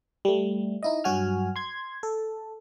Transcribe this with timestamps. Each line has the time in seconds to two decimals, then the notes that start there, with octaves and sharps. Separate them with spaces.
0.25 G3 A3
0.83 D#4 E4 D#5
1.04 G2 F#3 F#4 G#5 F6
1.56 C6 G#6
2.03 A4